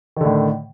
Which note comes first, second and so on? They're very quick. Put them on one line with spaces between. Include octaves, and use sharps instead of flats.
D#3 D3 A2